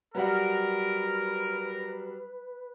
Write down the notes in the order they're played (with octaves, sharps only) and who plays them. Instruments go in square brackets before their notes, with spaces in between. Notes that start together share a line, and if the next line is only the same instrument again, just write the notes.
[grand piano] F#3 G3 F#5 [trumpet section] A#4 [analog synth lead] B4